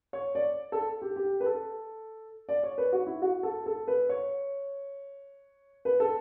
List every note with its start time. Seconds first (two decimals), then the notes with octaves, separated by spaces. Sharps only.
0.13 C#5
0.35 D5
0.72 A4
1.02 G4
1.16 G4
1.40 B4
1.46 A4
2.49 D5
2.63 C#5
2.78 B4
2.92 F#4
3.06 E4
3.22 F#4
3.43 A4
3.66 A4
3.88 B4
4.09 C#5
5.85 B4
6.00 A4